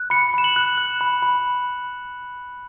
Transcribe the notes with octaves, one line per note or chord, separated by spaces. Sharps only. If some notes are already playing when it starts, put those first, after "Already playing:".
Already playing: F#6
B5 C#7
B5 E7
F#7
F#6
F#6
B5
B5